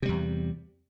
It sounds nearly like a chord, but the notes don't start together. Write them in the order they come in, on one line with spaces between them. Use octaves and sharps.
C3 G3 E2